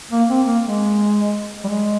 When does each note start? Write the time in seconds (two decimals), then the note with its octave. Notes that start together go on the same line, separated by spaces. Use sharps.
0.11 A#3
0.29 C4
0.46 A#3
0.64 G#3
1.64 G3
1.68 G#3